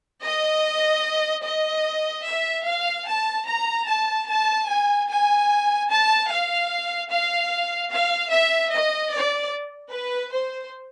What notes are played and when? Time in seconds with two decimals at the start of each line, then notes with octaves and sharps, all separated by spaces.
0.22 D#5
1.44 D#5
2.24 E5
2.65 F5
3.05 A5
3.45 A#5
3.85 A5
4.26 A5
4.66 G#5
5.07 G#5
5.88 A5
6.28 F5
7.09 F5
7.90 F5
8.29 E5
8.70 D#5
9.10 D5
9.91 B4
10.32 C5